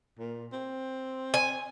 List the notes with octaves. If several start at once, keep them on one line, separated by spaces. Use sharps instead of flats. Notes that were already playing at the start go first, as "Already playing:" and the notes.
A#2
C4
G#5